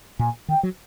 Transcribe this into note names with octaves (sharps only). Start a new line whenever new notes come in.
A#2 G#5
D#3 G5
F#3